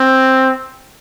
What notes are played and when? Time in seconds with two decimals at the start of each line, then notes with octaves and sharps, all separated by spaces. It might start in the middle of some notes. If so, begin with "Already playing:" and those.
Already playing: C4